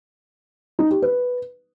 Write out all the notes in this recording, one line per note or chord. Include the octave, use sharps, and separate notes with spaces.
D#4
G4
B4